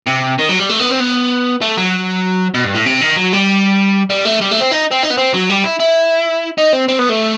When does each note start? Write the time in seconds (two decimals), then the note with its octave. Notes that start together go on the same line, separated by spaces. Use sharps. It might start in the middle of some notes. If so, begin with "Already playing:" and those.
0.07 C3
0.39 D#3
0.49 F#3
0.59 G3
0.69 A3
0.79 B3
0.90 C4
1.00 B3
1.62 A3
1.77 F#3
2.54 B2
2.65 G2
2.75 A2
2.86 C3
3.01 D#3
3.16 F#3
3.33 G3
4.10 G3
4.25 A3
4.41 G3
4.52 A3
4.61 C4
4.72 D#4
4.91 C4
5.03 D#4
5.10 B3
5.17 C4
5.34 F#3
5.50 G3
5.64 E4
5.80 E4
6.58 D#4
6.73 C4
6.88 C4
6.99 B3
7.09 A3